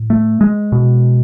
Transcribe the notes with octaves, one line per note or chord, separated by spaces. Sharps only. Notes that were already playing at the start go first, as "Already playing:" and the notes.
Already playing: A2
A3
G#3
B2